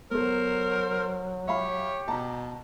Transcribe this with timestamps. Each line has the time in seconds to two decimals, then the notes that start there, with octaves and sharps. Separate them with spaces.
0.11 F#3 B3 A4 A#4 C5
1.48 G4 C#5 E5 F5 B5
2.08 B2 A5 A#5